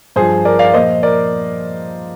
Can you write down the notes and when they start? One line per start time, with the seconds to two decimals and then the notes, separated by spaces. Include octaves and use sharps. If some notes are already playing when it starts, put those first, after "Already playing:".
0.16 G2 F3 G#4 C5
0.45 A#4 D5
0.59 D5 F5
0.74 A#2 F3 C5 D#5
1.03 A#4 D5